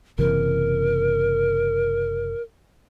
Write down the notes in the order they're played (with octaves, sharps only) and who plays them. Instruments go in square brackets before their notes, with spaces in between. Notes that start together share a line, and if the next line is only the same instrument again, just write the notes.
[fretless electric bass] F#1 C3 E3 [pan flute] A#4